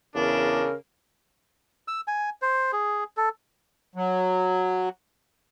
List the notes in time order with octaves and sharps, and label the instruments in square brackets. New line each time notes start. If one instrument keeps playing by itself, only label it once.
[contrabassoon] E2 [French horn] C#3 [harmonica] D4 [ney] A#4
[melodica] E6
G#5
C5
G#4
A4
[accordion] F#3